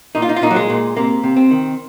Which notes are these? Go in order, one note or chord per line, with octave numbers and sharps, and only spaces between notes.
A#2 D#4
F4
D#4
F4
A#2 D#4
F#3
G#3
A#2
C3 A#3
C3
C4
D#3